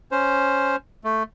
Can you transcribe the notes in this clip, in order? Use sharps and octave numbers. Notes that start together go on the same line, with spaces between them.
C#4 C5
A3